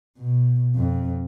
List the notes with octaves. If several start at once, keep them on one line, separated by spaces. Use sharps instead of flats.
B2
F2